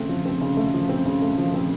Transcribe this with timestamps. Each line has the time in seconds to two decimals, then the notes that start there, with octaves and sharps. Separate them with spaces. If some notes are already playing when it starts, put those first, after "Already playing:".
Already playing: C#3 A3 C4
0.09 F3
0.25 C4
0.41 C#3
0.57 A3
0.74 F3
0.89 C4
1.06 C#3
1.22 A3
1.38 F3
1.54 C4